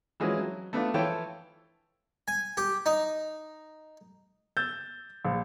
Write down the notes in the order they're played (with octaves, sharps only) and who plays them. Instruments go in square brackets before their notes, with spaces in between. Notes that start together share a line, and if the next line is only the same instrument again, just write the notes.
[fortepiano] E3 F3 G#3 C4 C#4 F#4
F#3
A3 B3 D4 F4
E3 F3 F4 A4 C#5 G5
[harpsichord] G#5
G4
D#4
[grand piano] E6 G6 A6
A#1